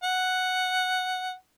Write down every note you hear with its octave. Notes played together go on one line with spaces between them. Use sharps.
F#5